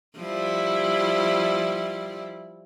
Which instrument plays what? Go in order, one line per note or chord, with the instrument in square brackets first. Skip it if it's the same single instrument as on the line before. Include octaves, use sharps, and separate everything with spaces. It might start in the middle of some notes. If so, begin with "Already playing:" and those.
[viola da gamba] F3 G3 E4